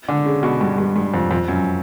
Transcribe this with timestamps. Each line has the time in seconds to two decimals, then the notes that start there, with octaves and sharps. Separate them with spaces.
0.09 D3
0.26 C#3
0.43 B2
0.61 G2
0.78 G2
0.96 G2
1.14 F2
1.31 F2
1.48 F#2